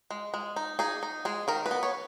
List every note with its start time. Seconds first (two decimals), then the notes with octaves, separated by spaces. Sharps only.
0.11 G#3
0.34 G#3
0.56 D#4
0.79 D#4 G#4
1.03 D#4
1.25 G#3 G#4
1.48 D#3 A#4
1.66 B4
1.71 B3
1.83 C#5